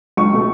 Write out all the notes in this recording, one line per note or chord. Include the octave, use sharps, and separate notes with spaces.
C#2 C#6
B2 A3